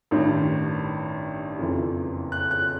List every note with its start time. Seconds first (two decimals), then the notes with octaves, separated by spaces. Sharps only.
0.11 A1 G2 D#3
1.59 F#1 F2 C#3 E3
2.32 F#6
2.51 F#6